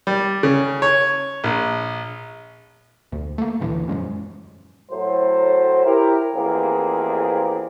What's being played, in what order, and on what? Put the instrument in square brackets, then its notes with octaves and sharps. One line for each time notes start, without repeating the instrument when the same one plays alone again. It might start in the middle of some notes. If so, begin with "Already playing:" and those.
[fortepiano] G3
C#3
C#5
A#1
[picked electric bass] D2
A3 A#3
A1 D2 A#2 E3
F#2 F3 G#3 C#4
[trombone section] A2 F#3 C5
E4 G4 A#4
A1 E2 F3 A#3 C4 G#4